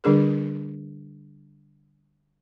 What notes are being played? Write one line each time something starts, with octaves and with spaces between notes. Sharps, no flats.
D3 G3 D4 G#4 A#4